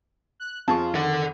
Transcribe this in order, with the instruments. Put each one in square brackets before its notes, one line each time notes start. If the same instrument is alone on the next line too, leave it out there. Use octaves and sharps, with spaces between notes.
[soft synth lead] F#6
[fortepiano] F2 G#4 C#6 [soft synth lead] F4 [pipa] A5
[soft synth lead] D#3 [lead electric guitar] A4 F#5